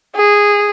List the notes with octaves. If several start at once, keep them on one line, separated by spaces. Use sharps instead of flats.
G#4